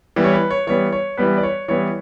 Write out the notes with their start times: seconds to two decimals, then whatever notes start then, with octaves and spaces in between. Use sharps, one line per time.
0.16 E3 G3 B3
0.24 C#5
0.33 B4
0.51 C#5
0.67 E3 G3 B3 C#5
0.92 C#5
1.17 E3 G3 B3 B4
1.38 D5
1.43 C#5
1.68 E3 G3 B3 C#5